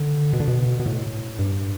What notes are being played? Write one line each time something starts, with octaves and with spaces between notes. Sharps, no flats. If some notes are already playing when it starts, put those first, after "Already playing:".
Already playing: D3
B2
D3
B2
B2
A2
G2